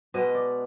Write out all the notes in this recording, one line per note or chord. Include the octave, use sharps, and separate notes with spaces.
B2 G#3 B3 D#5
D5